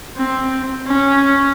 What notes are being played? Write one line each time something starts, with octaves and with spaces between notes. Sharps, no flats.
C4
C#4